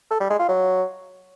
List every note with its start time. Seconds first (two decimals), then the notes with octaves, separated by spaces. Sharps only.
0.11 A4
0.20 G3
0.30 G#3
0.39 F4
0.49 F#3